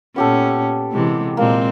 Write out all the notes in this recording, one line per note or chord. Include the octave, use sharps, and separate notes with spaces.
A#2 B3 C#4 G4 A4
C3 E3 G#3
A#2 G#3 A#3 C4